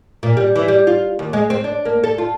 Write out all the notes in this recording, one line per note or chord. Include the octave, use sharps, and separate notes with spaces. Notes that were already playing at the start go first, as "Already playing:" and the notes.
A#2
G3
E3
G3
F4
D#2
G#3
C4
D4
A#3
A4
F4